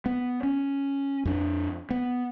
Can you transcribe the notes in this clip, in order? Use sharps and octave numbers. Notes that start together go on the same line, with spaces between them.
B3
C#4
F2 D4
B3